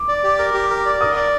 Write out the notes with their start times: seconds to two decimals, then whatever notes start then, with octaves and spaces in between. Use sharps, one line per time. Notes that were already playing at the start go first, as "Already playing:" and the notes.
Already playing: D6
0.08 D5
0.24 G4
0.39 A#4
0.54 G4
0.70 A#4
0.86 D5
1.01 A#4 D#6
1.16 D5